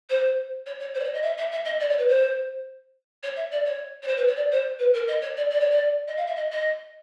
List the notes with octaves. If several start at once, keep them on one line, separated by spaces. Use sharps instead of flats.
C5
C#5
C#5
C5
D5
C#5
D#5
E5
E5
E5
D#5
D5
C#5
B4
C5
C#5
E5
D5
C#5
C#5
C5
B4
C#5
D5
C5
B4
A#4
D#5
C#5
D5
D5
C#5
D5
D#5
F5
E5
D#5
D#5